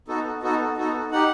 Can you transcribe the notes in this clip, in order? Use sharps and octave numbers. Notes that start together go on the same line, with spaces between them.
B3 D#4 F#4 A4
B3 D#4 F#4 A4
B3 D#4 F#4 A4
D#4 G4 F#5